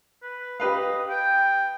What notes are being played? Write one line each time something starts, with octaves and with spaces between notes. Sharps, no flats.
B4
G4 B4 D#5 F5
G5